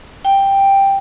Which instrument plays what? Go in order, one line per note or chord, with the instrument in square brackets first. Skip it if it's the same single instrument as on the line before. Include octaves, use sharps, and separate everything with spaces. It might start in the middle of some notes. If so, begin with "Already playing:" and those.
[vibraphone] G5